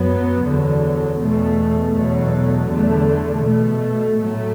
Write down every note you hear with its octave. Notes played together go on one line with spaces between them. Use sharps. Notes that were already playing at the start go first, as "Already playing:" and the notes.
Already playing: F#2 F#3 B3
E2 D3 F#3
E2 B2 A3
E2 B2 F#3 A3
E2 D3 A3
B2 A3
A2 F#3 A3